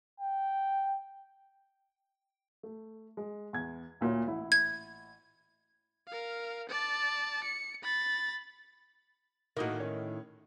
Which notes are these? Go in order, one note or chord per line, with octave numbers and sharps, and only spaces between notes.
G5
A3
G#3
E2 G#6
D2 A#2 C#5
A1 E4
G#6
A#4 F5
D5 A5
C#7
B5 A6
A2 D#3 A#3 D#4 F#4
C#4